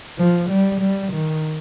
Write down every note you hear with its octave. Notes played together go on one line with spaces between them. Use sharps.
F3
G3
G3
D#3